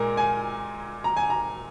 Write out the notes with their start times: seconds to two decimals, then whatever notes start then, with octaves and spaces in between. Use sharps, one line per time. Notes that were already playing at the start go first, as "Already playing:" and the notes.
Already playing: A#2 G#3 A#4
0.17 G#5
1.04 A#5
1.17 G#5
1.30 A#5